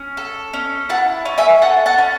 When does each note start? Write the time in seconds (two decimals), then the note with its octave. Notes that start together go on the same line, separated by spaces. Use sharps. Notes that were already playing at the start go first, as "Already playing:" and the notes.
Already playing: C#4
0.17 A4
0.53 C#4
0.89 E4 F#5 A5
1.25 C#4
1.38 E5 G#5
1.61 A4 F#5 A5
1.86 F#5 A5
1.98 C#4